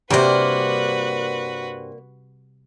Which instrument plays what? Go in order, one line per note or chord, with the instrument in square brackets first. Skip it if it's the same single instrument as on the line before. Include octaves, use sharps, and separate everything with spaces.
[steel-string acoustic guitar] G2 C5 [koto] C3 G3 [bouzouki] A#3 D5 [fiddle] F#4 B4